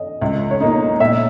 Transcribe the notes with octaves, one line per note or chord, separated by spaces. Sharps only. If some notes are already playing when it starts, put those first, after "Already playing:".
Already playing: D#5
C#2 E5
C#5
B2 A#3 D#4 D#5
A#2 E5